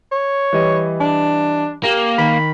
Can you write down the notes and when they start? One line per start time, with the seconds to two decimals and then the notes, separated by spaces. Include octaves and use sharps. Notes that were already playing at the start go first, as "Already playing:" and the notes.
0.12 C#5
0.53 E3 G3 D#5
1.00 D4
1.84 A#3 G4 F5
2.18 D#3 B5